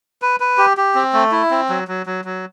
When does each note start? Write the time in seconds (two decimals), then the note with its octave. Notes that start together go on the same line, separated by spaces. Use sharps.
0.22 B4
0.40 B4
0.58 G4
0.77 G4
0.95 C4
1.13 A3
1.32 E4
1.51 C4
1.69 F#3
1.88 F#3
2.06 F#3
2.25 F#3